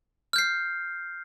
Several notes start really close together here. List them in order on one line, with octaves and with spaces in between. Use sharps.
F6 G6 C7